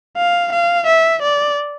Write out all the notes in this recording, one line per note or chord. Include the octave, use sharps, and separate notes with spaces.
F5
F5
E5
D5